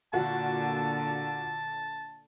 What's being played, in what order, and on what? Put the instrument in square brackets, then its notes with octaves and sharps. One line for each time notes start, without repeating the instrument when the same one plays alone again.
[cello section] A#2 D3 [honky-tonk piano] F4 F#4 [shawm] A5